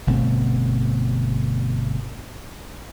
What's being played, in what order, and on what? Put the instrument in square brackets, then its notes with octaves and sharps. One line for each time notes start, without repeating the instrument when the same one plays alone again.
[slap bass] G1 B2 A3 C4